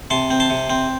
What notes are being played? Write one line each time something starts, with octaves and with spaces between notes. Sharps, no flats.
C3 A5 C6
C4
A5 C6
C3
C4